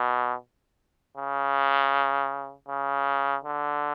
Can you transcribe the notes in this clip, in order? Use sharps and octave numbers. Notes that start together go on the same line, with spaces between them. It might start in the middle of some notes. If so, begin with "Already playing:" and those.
Already playing: B2
C#3
C#3
D3